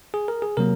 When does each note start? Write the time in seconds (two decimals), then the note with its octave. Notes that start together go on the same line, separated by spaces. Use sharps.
0.14 G#4
0.28 A#4
0.42 G#4
0.57 C3 F#3 A#3 A#4